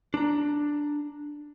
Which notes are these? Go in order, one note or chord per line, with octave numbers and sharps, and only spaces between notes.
D4 A#5